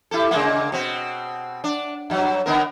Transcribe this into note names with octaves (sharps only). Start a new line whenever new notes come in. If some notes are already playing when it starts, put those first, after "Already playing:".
E4 G4 A4
C#3 G#3 A#3
B2 C4
D4
G2 F#3
D3 B3 A#4